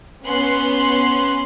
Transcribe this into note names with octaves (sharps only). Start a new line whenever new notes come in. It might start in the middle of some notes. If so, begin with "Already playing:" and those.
B3 C#4 C6 F#6